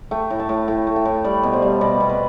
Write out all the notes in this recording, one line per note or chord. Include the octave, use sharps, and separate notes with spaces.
A3 G5
A2
A5
A2
A2 G5
A3
G5
A2
G3 D5
B2
C5
G3
B2 D5
B2
B4